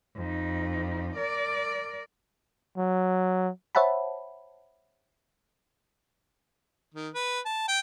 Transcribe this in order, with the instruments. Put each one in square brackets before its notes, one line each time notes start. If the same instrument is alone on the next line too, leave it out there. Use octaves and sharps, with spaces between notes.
[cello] F2 D#4
A#4 D5
[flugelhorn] F#3
[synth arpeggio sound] C5 C#5 E5 F#5 A5 B5
[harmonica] D#3
B4
A5
G5